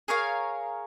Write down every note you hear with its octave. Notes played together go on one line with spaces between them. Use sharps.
G#4 A#4 C#5 F5